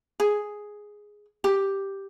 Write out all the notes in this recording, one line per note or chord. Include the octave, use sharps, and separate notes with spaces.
G#4
G4